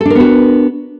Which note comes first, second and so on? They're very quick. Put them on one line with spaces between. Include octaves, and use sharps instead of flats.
A4 D4 A#4 B3 F#4